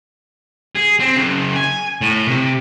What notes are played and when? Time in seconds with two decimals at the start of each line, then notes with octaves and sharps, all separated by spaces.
0.75 G#4
0.99 C4
1.16 F#2 C#3
1.56 G#5
2.01 A2
2.28 C3